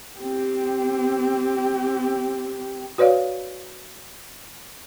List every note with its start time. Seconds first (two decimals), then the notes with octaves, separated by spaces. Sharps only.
0.19 C4 G4
2.98 F#4 B4 C#5 D5 F5